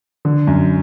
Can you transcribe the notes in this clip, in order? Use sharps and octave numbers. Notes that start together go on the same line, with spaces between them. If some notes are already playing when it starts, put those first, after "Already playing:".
D3
F#2